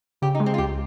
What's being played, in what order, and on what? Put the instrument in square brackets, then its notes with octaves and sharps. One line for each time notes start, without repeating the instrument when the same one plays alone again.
[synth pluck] C#3 [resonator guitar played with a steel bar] G4
[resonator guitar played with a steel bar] D#4
[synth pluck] G#3
[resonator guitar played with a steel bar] C4
F4
[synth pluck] C#2 [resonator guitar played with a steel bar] G4